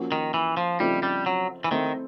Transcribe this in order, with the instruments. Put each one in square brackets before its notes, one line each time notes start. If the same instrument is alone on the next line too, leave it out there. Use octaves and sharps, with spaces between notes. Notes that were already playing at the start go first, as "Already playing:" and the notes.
Already playing: [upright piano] F3 A#3 C#4 F#4
[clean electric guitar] D#3
E3
F3
[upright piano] C#3 F3 A3 C4 D#4 [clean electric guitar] G3
[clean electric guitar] G3
F#3
E3
[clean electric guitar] D#3 [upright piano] A3 C4 E4 A4